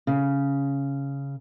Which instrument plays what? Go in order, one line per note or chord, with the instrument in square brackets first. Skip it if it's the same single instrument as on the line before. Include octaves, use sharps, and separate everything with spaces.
[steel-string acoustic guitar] C#3